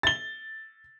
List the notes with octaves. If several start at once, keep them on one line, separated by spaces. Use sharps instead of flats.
A6 G7